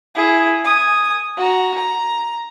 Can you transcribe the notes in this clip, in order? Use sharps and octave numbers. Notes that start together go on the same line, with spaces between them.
E4 G#4
G#5 D#6
F#4 A#5
A#5